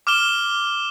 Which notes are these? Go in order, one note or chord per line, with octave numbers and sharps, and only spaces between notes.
D6 F6 E7 G7